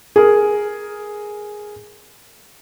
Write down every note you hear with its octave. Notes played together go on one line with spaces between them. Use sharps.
G#4 A#4